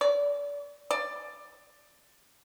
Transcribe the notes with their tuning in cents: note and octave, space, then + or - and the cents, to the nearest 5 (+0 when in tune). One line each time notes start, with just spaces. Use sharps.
D5 -30
D5 +10